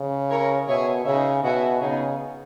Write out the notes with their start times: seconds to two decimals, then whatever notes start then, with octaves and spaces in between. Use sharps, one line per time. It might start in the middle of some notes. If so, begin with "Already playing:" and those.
Already playing: C#3
0.29 E4 A#4 C#5
0.67 B2 G#4 C#5 E5 G#5
1.05 C#3 D#4 G#4 C#5 E5
1.44 B2 F#4 C#5 E5 G#5
1.81 C#3 B3 D#4 G#4